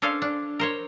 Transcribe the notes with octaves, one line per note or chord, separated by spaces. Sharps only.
C#4 D4 A4 C5 F5
D4
A#4 C5 C#5